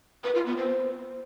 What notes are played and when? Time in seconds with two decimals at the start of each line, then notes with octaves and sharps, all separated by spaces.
0.24 B4
0.35 F4
0.46 B3
0.57 C5